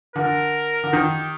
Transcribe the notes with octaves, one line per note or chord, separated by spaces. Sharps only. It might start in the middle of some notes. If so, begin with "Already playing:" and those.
D3 A#4
D3
D#3 G4